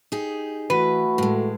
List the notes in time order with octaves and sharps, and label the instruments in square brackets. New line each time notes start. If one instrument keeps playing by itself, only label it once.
[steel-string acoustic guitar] D#4 G4 G#4
[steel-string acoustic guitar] E3 [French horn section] A3 F#4 [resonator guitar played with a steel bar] B4
[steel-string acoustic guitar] A2 G#3